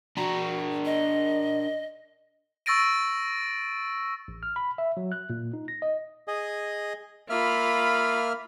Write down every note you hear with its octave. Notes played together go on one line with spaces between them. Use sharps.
D4 F#4 A#4
D#5
C#6 E6 A6 A#6 D7 D#7
A1
F6
B5
E5
F#3
F#6
A#2
D#4
A#6
D#5
G#4 D#5
A#3 F4 E5 B5 F6